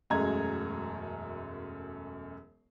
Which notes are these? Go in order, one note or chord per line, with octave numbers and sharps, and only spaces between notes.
E1 F#2 G#3 A3 A#5 G#6